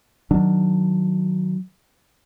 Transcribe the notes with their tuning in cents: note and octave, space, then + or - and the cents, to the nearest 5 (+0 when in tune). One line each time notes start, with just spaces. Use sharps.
D#3 +0 F#3 +0 D4 +5